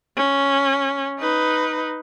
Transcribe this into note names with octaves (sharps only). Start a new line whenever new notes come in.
C#4
D#4 B4